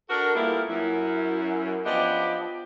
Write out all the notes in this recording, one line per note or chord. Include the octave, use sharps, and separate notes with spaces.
D4 F#4 A4 A#4
G3 A#3 B3 E4 F4 A4
F#2 E4
F3 B3 D4 G4 D#5